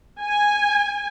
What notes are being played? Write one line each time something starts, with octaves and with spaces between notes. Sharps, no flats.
G#5